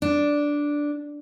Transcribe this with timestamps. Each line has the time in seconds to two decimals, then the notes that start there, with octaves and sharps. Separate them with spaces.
0.02 D4